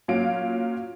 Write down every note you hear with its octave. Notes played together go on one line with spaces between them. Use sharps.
A#2 F#3 C#4 F5 D7